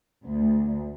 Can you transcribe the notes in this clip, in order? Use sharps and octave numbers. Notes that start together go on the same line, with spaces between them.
D2